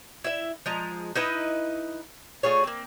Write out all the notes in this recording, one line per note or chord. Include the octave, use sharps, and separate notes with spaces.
E4 E5
F3 G#3 A#5
D#4 E4 B4 D#5
A3 F4 G#4 C#5
A#3 C4